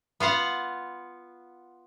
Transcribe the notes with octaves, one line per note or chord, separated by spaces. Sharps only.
B3 F4 F5 F#5